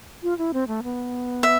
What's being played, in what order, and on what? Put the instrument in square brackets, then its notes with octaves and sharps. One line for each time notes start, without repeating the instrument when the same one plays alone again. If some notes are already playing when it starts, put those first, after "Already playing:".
[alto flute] F4
E4
C4
A3
B3
[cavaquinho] E5